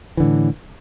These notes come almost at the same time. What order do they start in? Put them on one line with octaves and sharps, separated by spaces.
E3 D3 A2